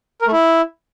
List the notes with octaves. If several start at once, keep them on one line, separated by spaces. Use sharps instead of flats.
A#4
A3
E4